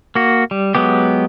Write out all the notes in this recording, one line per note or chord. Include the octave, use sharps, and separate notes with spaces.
A#3 F#4
G3
F#3 G#3 B3 G4